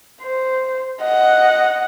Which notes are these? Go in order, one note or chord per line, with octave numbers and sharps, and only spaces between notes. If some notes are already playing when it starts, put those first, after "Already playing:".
C5
D#5 F#5